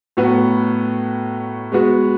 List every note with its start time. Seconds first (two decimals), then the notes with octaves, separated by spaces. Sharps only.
0.17 A2 F#3 B3 F#4
1.72 G#3 B3 F#4